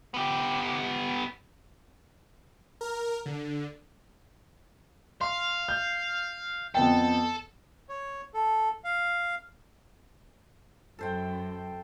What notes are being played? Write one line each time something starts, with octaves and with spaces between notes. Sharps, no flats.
B3 G4
A#4
D3
F5 C6
G6
F2 B3 A4 G5
C#5
A4
F5
F#2 A4 C5 G5